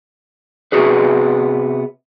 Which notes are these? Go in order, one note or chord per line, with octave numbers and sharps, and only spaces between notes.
C3 B3 C#4 F#4 G#4 B4